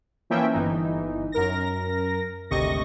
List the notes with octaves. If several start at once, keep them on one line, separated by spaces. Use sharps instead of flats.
E3 F3 A#3 C#4 E5 G5
G1 E3 D#4
F#2 A#4 A#6
G#1 D2 C3 D#5 C#6 A#6